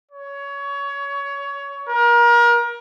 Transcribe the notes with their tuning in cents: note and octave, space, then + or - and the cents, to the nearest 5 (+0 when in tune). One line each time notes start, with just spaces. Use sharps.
C#5 +20
A#4 +30